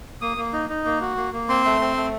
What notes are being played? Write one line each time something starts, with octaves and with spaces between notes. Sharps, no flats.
A#3 D#6
A#3
D#4
D#4
A#3
F#4
A#3
A#3
C4 C6
A3
C4
A3